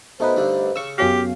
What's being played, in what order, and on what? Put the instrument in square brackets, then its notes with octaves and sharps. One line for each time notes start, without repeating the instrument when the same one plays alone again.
[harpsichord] B2 [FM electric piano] A3 D#4 B4 [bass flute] C5
[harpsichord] G2 D3
[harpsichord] C#3 [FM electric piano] C#6 E6
[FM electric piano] F#2 C#4 F5 [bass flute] B3 [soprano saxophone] G4